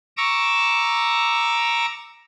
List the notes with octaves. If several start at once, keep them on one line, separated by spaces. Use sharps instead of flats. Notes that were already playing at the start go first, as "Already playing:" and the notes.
A#5 C#6 D6 E6